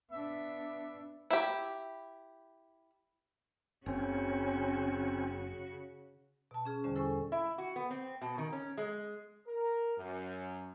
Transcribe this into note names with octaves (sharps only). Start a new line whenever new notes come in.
B3 D4 E5
E4 G4
F#1 C#3 C4 C#4 F#4
B2 A5
C#4 G#4 F6
E2 D3 G3 C#4 C5
E4 A4 C5 G#5 C#6
E4
F#4
B3
C4
B2
D#3
C#4
G#3
A#4
F#2